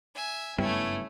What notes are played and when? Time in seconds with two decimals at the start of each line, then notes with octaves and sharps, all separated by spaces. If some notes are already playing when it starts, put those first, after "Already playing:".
0.15 E5 G#5
0.58 F#1 G2 G3 A3 B3 C#4 E4